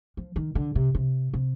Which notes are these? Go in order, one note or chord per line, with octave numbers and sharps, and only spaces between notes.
F3
D#3
D3
C3
C3
C3